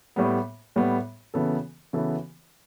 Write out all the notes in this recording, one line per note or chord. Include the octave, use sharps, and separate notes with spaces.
A2 G3 B3
A2 G3 B3
C#3 E3 B3 F#4 A4
C#3 E3 B3 F#4 A4